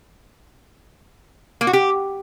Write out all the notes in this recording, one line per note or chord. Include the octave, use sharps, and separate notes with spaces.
A#3
F#4
G4